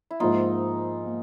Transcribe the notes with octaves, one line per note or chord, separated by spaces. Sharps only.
E4
G#2 F3 A#3 D#4 F4
A#3